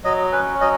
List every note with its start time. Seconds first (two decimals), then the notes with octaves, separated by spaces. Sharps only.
0.04 F#3 D#5
0.32 C#4 B4
0.61 F#3 D#5